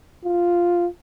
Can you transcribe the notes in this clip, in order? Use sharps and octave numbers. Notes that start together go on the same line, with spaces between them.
F4